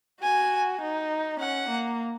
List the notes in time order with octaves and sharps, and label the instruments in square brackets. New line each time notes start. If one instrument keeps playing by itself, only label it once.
[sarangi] F#4 [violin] G#5
[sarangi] D#4
[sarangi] C#4 [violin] F#5
[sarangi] A#3